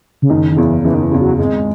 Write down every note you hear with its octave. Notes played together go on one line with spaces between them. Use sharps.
C#3
F#1 D#3
D#3
E2 C#3 E3
F#1 E3
D#3
E3
E2 C#3
F#3
G#1 G#3